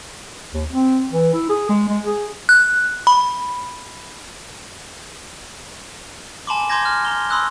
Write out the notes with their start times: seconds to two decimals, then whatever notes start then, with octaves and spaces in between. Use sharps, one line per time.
0.54 D#2
0.70 C4
1.12 E3
1.34 E4
1.49 G#4
1.69 G#3
1.89 G#3
2.04 G#4
2.49 F#6
3.07 B5
6.47 G#5 A5 B5 C6 D6
6.70 A#5 C6 D6 G6 G#6 A#6
6.85 F6
7.05 A#5 C6 F6 G7
7.30 B5 C6 D#6 E6 F#6